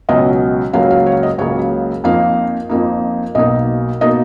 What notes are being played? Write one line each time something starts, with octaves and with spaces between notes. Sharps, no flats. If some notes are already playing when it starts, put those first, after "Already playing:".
C#2 B2 F#3 C#4 D#5
C#2 C#3 F#3 A#3 F5
F5
C#5
D#5
C#2 C#3 F#3 A#3 C#5
F2 F3 A#3 D#4 F5
F2 F3 A#3 D#4
B1 B2 A#3 D#4 D#5
B2 A#3 D#4 D#5